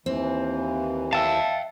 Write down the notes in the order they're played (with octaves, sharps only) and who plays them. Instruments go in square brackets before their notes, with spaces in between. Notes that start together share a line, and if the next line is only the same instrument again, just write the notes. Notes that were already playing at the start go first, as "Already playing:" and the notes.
[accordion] D#2 E3 [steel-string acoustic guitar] C4
[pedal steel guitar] E5 A5 [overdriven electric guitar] F5 G5